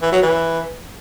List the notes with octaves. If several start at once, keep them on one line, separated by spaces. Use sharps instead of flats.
E3
F#3
E3